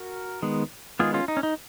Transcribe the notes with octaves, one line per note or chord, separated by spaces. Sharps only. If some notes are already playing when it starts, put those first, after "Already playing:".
Already playing: F#4 A#4
D#3 G#3 B3
D#3 G#3 B3 F4 G#4
C#4 F4
D#4
C#4
D#4